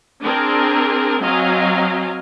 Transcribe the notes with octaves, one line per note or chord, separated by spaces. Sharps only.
C4 D4 G#4 A#4
F#3 C4 D#5 F5 G#5 A#5